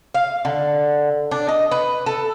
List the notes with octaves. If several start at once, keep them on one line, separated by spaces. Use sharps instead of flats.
F5
D3
D4
D#5
B4
A4